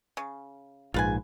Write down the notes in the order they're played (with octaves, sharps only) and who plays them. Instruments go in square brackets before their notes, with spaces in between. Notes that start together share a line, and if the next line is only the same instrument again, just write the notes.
[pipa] C#3
[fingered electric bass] A#1 G#2 [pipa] F4 B4 G#5